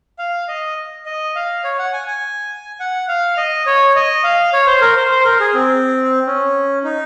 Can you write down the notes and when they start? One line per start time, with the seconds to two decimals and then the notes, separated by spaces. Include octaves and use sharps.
0.19 F5
0.48 D#5
1.06 D#5
1.36 F5
1.64 C#5
1.79 F#5
1.93 G#5
2.07 G#5
2.80 F#5
3.08 F5
3.37 D#5
3.66 C#5
3.96 D#5
4.24 F5
4.53 C#5
4.67 C5
4.81 A#4
4.96 C5
5.11 C5
5.25 A#4
5.40 G#4
5.54 C4
6.27 C#4
6.84 D#4